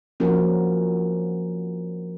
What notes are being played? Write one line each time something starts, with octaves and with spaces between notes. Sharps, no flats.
F3 A#3 C#4 F#4 A#4